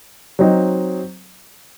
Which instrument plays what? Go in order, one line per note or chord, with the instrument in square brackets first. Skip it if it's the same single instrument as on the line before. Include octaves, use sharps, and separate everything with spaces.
[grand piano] F#3 C4 D#4